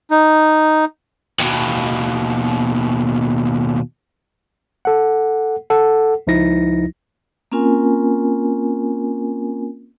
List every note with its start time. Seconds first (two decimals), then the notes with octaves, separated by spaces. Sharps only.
0.11 D#4
1.39 D#2 B2
4.85 A4 F#5
5.70 A4 F#5
6.27 C#2 F3 D#4 E4 A#6
7.52 A#3 C4 C#4 F4 A#4 G#5